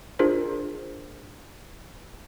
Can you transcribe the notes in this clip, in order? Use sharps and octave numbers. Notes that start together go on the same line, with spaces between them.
D4 F4 G#4 A#4 C5